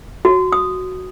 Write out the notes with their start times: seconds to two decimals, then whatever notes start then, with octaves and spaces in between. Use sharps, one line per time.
0.25 F#4
0.52 D#6